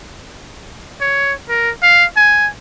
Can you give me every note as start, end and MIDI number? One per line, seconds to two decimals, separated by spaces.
1.01 1.33 73
1.49 1.70 70
1.83 2.05 77
2.17 2.49 80